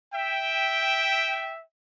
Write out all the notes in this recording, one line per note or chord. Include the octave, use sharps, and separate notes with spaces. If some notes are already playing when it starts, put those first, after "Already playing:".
E5 G5